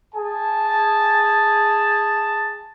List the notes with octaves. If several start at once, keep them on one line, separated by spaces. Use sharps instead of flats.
G#4 G#5 A5